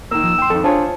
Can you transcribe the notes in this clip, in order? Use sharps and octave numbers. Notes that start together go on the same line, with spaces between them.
D#3 A#3 E6
F3
G5 C6
F2 D#3 A4
D4 F4 G#4 C5 C#5